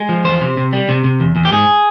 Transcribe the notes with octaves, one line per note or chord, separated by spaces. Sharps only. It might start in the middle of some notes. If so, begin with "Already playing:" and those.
Already playing: G#3
F3
E2 C5
C3
C3
G3
C3
C3
E2
E2
G4
G#2 G#4